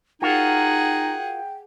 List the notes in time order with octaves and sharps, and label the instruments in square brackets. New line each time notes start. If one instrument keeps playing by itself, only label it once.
[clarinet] D#4 [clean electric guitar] F4 F#4 A#4 [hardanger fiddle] G#4 F#5 [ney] G5